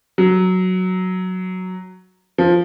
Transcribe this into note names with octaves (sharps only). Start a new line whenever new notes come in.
F#3
F3